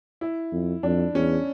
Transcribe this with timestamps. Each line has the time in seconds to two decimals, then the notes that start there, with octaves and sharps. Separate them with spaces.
0.21 E4
0.53 F2
0.83 F2 D4
1.15 E2 C#4